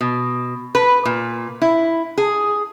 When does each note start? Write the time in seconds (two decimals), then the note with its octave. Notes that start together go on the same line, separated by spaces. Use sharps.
0.01 B2
0.75 B4
1.05 A#2
1.62 E4
2.18 G#4